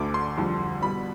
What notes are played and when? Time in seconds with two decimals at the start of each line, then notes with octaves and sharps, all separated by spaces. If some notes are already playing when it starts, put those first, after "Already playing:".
Already playing: D2 D3 A3 D6
0.14 C6
0.38 F2 D3 G3
0.82 B2 G3 B3 B5